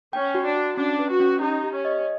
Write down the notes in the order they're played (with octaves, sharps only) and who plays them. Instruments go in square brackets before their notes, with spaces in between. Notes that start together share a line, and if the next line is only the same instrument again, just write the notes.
[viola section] C#4 [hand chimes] G5
[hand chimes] F#4
[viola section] D4
[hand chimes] F#4
[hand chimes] C#4 [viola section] D4
[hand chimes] B4
[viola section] F#4
[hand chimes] C#4
[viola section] D#4 [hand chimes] G4
[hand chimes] G4
[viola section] C#4
[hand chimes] D#5